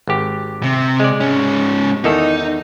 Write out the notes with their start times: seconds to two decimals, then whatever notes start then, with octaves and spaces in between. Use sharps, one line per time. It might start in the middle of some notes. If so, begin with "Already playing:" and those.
0.07 G#1 G4
0.63 C3
1.00 G#3 D5
1.21 G#2 C#4
2.04 E2 D#3 D#4 A4